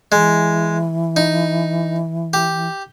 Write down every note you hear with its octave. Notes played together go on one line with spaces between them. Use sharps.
E3 G#3
D#4
G4